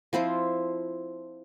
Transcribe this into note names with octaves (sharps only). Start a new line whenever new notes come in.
F3 C4 E4 F4